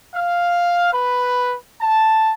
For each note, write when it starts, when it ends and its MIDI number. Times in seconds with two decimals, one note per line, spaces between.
0.15 0.92 77
0.93 1.54 71
1.82 2.32 81